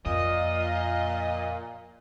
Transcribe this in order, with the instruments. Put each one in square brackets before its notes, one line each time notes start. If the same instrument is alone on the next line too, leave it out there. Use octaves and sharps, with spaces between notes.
[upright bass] F2 [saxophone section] A#2 [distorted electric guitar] D#5 [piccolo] F5